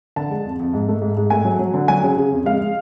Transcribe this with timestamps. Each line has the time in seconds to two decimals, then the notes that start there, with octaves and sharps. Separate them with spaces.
0.16 D3 A5
0.30 G#3
0.45 F2
0.59 F2
0.73 G#2
0.88 A3
1.02 G#2
1.17 G#2
1.30 A3 G#5
1.45 F#3
1.59 F#3
1.74 D3
1.88 F#3 G#5
2.03 C#3
2.18 C#3
2.32 F2
2.46 G#3 F5
2.60 G#3